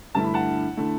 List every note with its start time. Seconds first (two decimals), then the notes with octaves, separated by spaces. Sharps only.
0.15 G2 D3 A3 E4 A5
0.24 B5
0.34 F#5 A5
0.77 D3 A3 E4